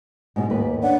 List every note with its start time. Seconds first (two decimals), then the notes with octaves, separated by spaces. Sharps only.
0.36 G#2 B2 G#3
0.50 D#2 B4
0.83 D4 C#5 F#5